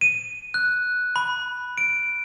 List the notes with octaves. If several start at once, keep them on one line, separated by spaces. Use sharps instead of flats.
D#7
F#6
B5
D7